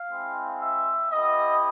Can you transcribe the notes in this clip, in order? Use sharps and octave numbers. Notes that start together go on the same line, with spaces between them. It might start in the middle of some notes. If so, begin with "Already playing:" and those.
Already playing: F5
G#3 C4 E4
E5
B3 E4 G4 D#5